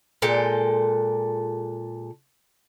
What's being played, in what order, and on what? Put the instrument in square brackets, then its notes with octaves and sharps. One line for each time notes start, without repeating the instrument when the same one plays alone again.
[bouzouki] A#2 G#3 A4 G5